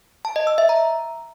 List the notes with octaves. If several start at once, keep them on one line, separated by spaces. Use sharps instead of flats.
A5
D#5
E6
E5
A#5